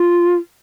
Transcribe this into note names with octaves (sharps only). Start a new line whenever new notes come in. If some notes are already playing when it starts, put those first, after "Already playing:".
Already playing: F4